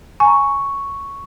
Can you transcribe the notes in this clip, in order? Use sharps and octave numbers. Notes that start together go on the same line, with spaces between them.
G#5 A#5 C#6